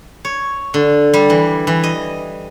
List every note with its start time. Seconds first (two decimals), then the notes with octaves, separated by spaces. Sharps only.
0.25 C#5
0.74 D3
1.14 G3
1.30 E3
1.67 E3
1.84 D#5